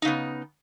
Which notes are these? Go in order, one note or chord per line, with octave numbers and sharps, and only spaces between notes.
C#3 B3 D#4